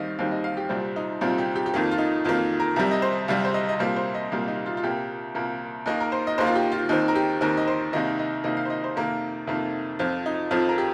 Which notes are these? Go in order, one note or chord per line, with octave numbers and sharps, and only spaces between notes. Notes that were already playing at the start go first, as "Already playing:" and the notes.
Already playing: D#2 D#3 G3 C4 D#5 F5
D#2 D#3 G3 C4 F5
D#5
F5
G4
C2 A#2 G3 C4 F4
D#4
C2 A#2 G3 C4 F4
G4
G4
G4
F2 D#3 A#3 F4
F4
D#4
F2 D#3 A#3 F4
A#4
C2 C3 G3 A#4
D#5
C5
C2 C3 G3 F5
C5
D#5
D#5
C2 A#2 G3 A#3 C5
C5
D#5
C2 A#2 G3 A#3 F5
D#4
F4
F4
C2 A#2 A#3 G4
C2 A#2 A#3
D#2 D#3 A#3 D#5
A#4
C5
D#5
D#2 D#3 A#3 C5
F4
G4
F4
D#2 D#3 C4 D#4
A#4
G4
D#2 D#3 C4 A#4
D#5
C5
C2 C3 D#3 A#3 D#5
D#5
C2 C3 D#3 A#3 D#5
F5
C5
D#5
C5
F2 C3 D#3 A#3 A#4
F2 C3 D#3 A#3
F2 F3 C4 F4
D#4
F2 F3 C4 F4
A#4
G4